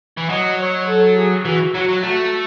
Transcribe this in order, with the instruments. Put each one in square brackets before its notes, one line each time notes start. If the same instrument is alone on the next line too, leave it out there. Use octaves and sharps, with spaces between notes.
[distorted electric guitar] E3
[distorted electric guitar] F#3 [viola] D#5
[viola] C#5
A4
G#4
[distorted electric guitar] E3 [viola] F#4
[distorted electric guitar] F#3 [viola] F#4
[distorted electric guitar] F#3
[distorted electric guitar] A3 [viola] F#4